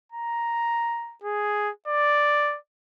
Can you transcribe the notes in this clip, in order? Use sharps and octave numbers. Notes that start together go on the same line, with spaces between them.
A#5
G#4
D5